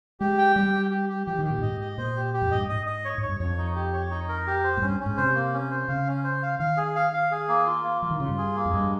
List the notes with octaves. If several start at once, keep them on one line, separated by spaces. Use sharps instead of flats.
G#3 G4
G5
G3 G4
G4
G4
G4
F3 G4
D#3
G4
A#2
G2
G#2 D#5
D#5
A#2 C5
G4
G4
F2
G2 D#5
G#2 D#5
D#5
C#5
G#2 C#5
G2
F2 C#5
D#4
G4
C#5
D#4
A#4
G4
C5
G#2
G2 C#4
C#4
G#2
C3 C5
A#3
C#4
C5
C#3 F5
C#4
C5
F5
D#3 F5
G#4
F5
F5
G#4
A#3
F4
A#3
F3 F4
D#3
C#3 F4
G2
G#4
A#3
F2
G2 G#3